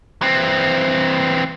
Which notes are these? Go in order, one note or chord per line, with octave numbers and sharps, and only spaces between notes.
E3 C4